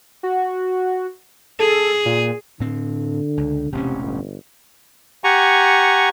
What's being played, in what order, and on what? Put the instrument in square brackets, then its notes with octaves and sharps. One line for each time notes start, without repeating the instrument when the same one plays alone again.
[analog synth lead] F#4
[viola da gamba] G#4 [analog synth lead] A4
[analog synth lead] A#2
[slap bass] A2 C4 [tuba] D3
[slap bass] C#2
[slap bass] E1 A1 C#4 [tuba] C3
[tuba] G1
[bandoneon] G4 F#5 G#5 A#5 C#6